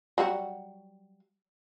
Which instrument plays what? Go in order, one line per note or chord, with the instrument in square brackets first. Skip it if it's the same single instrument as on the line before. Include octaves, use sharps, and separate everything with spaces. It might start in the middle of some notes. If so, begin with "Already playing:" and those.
[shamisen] F#3 G3 F#4